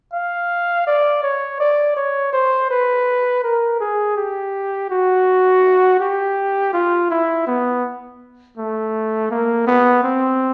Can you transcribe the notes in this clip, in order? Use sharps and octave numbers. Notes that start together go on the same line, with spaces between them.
F5
D5
C#5
D5
C#5
C5
B4
A#4
G#4
G4
F#4
G4
F4
E4
B3
A3
A#3
B3
C4